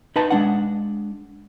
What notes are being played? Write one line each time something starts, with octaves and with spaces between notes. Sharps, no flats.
D#4 B4 D#5 A5
G#3 D4 F#5